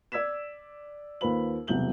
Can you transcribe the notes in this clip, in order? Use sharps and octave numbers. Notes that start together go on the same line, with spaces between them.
D5 E6 G#6 B6 E7
D#2 F4 B4 C5 B5 F#7
E1 C2 F#3 G6 F#7 G7